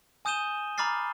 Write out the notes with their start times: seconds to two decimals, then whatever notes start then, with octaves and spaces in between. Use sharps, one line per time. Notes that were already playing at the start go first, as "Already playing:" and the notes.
0.25 G#5 D#6 G6 D#7 E7 G7
0.78 A#5 B5 D6 F6 A6 C7